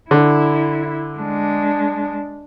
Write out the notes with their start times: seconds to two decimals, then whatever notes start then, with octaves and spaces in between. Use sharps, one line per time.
0.11 D3 E4
1.19 G#3 D4